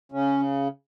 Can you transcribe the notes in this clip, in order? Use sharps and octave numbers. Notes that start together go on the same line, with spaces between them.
C#3 C#4